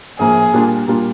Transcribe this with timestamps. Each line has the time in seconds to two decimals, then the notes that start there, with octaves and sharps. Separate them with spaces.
0.18 A#1 A2 F3 A#3 G#4
0.53 A#2 G3 A#3 D4 F4
0.87 A#2 G3 A#3 D4 F4